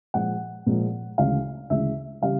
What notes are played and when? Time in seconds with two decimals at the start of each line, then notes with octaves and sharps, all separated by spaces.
0.14 A#2 F3 G#3 F#5
0.66 A#2 F3 G#3
1.18 D2 C#3 E3 G#3 F5
1.70 D2 C#3 E3 G#3 E5
2.22 C#3 E3 G3 F5